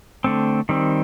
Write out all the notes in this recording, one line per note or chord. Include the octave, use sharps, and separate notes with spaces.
D3 A3 C4
D#3 G3 C4